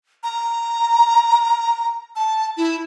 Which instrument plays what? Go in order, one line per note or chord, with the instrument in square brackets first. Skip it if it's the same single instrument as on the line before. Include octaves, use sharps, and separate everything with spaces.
[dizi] A#5
A5
E4